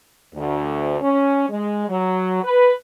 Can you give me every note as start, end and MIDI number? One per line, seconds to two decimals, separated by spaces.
0.35 0.96 38
1.01 1.49 61
1.49 1.88 56
1.89 2.40 54
2.43 2.72 71